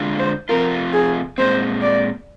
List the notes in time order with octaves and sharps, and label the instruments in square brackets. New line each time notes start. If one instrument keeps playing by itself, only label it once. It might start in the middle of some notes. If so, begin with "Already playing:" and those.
Already playing: [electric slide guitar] D3 G#3 D4 F4
[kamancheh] C5
[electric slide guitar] C3 F3 C4 F4 [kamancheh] A#4
[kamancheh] G#4
[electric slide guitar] A#2 G#3 C4 [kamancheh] C5
[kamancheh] D5